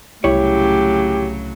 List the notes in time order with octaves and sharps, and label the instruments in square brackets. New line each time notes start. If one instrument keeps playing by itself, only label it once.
[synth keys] C2 [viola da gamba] A2 C#3 F#3 [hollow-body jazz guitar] E4 C#5 [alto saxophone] G4